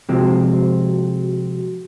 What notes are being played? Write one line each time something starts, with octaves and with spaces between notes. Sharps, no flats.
C3 F3 G#3 C4 F#4